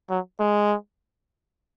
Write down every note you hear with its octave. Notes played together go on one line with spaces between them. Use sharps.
F#3
G#3